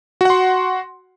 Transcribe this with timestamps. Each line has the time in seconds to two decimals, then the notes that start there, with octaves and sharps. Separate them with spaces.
0.21 F#4
0.25 F#5
0.30 C6